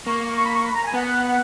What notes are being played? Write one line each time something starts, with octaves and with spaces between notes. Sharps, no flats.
A#3 C#6
C#6
B5
C#6
B5
A#5
G#5
B3 F#5
F#5